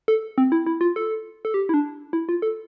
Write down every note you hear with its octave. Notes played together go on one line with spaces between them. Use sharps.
A4
C4
E4
E4
F4
A4
A4
G4
E4
D4
E4
F4
A4